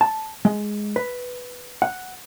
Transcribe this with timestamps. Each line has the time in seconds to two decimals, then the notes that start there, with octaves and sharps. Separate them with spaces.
0.01 A5
0.45 G#3
0.96 B4
1.82 F#5